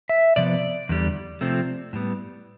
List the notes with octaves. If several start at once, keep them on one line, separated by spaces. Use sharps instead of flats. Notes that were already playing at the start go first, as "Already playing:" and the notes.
E5
C3 F3 B3 D5
E2 D3 G3
C3 F3 A3 C4
A2 G3 B3